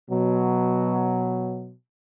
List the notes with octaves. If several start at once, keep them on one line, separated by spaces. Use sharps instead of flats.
B2 F#3